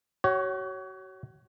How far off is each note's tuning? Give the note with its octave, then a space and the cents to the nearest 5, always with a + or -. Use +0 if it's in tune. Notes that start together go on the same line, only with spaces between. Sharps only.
F#4 +35 C#5 +0